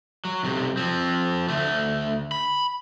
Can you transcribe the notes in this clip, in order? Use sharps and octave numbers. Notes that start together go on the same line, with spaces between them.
F#3
B1 C3
F3 C4
D2 A3
B5